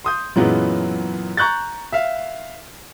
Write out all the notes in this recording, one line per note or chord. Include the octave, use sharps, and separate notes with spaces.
C6 D#6 G6
F#2 A#2 E3 F#3 G#3 B3
A#5 C#6 F#6 G6 A6
E5 F5